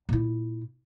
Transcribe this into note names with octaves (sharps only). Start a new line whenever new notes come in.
A#2 E4